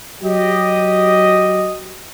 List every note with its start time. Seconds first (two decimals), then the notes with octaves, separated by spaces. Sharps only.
0.23 F#3 G4 D#5